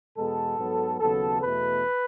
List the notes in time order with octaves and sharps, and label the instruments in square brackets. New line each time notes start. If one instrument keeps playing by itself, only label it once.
[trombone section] E2 B2 G#3 B3 A4
G#2 F#3 B3
D#2 C#3 F#3 B3 A4
E2 B2 A3 B4